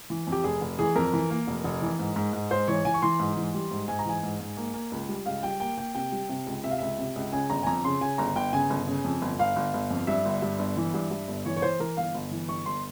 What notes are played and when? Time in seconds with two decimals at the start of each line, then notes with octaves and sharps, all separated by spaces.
0.10 E3
0.27 F2
0.32 G4
0.44 F1 G#4
0.61 F1
0.79 E3 G#4
0.96 F2 A#4
1.13 E3
1.30 A#3
1.47 F1
1.64 F1
1.82 E3
1.99 G#2
2.16 G#2
2.33 G#2
2.51 G#2 C5
2.68 E3 C#5
2.85 E3 G#5
2.94 C#6
3.02 E3 C6
3.20 G#2
3.37 E3
3.54 G3
3.71 G#2
3.88 G#2 G#5
3.99 A#5
4.06 E3 G#5
4.23 G#2
4.40 G#2
4.57 A#3
4.74 A#3
4.92 C#2
5.09 G3
5.26 C#2 F5
5.43 G3 G5
5.60 A#3 G5
5.78 A#3 G5
5.95 C3 G5
6.12 G3
6.29 C3
6.47 C#2
6.64 C3 E5
6.71 F5
6.78 C#2 E5
6.98 C3
7.16 C#2
7.32 C#3 G#5
7.50 G1 A#5
7.63 G#5
7.67 F2 A#5
7.84 C#3 C6
8.01 C#3 G#5
8.18 G1 A#5
8.36 G1 G5
8.53 C#3 G#5
8.70 G1
8.87 C#3
9.04 F2
9.22 G1
9.39 G1 F5
9.56 G1
9.74 G1
9.91 F2
10.07 G2 E5
10.25 G1
10.42 G2
10.59 G1
10.77 E3
10.94 G2
11.11 G2
11.28 G1
11.46 E3 C#5
11.57 C#5
11.62 E3 C5
11.79 E3 A#4
11.97 G1 F5
12.14 G1
12.31 E3
12.48 G1 C#6
12.66 G1 C6